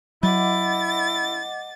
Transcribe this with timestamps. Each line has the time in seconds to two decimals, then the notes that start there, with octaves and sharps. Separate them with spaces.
0.23 F#3 E4 D#5 F#5 D6 A6